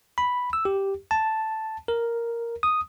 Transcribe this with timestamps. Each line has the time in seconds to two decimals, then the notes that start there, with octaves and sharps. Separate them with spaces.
0.18 B5
0.53 E6
0.65 G4
1.11 A5
1.88 A#4
2.63 D#6